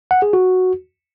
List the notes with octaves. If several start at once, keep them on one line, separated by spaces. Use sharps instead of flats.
F#5
G#4
F#4